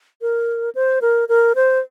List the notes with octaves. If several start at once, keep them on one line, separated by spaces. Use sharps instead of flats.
A#4
C5
A#4
A#4
C5